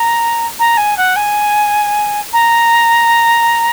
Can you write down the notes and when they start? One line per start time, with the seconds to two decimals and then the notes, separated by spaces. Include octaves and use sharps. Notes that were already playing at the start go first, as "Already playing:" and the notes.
Already playing: A#5
0.59 A#5
0.77 G#5
0.97 F#5
1.16 G#5
2.32 A#5